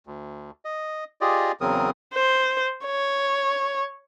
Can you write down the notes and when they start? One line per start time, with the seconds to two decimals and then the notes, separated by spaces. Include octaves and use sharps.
0.07 D2
0.65 D#5
1.21 F4 G4 G#4 D5 D#5
1.61 E2 C#3 F#3 C4 A#4 D#6
2.14 C5
2.86 C#5